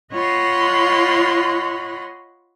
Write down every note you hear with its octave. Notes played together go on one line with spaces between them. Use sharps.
F4 C#5 D#5 F#5 B5 C6